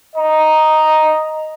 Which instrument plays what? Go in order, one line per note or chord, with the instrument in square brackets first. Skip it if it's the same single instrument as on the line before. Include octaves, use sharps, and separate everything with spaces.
[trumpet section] D#5 A#5